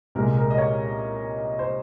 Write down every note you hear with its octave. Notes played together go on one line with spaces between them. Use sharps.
C2 A#2 G#3 A#4
A#4
D#5
C#5
C5